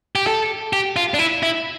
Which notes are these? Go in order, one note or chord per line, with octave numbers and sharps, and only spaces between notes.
G4
A4
G4
F4
D4
E4
E4